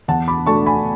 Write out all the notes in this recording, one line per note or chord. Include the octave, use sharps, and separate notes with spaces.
E2 F#5 A5
B5 D6
B2 A3 D4 A5 C#6
G#5 B5